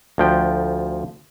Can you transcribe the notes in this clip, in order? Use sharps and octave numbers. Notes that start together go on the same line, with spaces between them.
D2 F3 G5